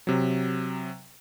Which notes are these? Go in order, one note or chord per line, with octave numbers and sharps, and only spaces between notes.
C3 F#3